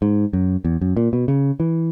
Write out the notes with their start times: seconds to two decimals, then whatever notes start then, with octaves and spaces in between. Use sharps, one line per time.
0.02 G#2
0.33 F#2
0.65 E2
0.81 F#2
0.97 A#2
1.13 B2
1.28 C#3
1.60 E3